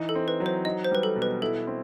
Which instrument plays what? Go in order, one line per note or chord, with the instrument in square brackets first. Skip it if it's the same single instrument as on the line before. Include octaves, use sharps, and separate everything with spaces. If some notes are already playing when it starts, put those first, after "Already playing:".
Already playing: [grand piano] E3 D#4
[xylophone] A4
[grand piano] C4
[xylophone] B4
[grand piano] F#3
[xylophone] C5
[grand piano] D#4 [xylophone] D#5
[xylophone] C5
[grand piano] G3 [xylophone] B4
[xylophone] A4
[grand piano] B2
[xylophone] B4
[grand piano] E4 [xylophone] A4
[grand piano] C4